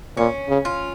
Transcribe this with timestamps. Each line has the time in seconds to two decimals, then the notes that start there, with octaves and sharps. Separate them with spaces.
0.17 A#2 C#4
0.49 C#3
0.65 F4